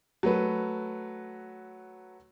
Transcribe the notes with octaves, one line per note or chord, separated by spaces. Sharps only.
F#3 A3 B4